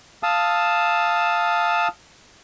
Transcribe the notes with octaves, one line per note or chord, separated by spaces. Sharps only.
F5 A5 D#6 E6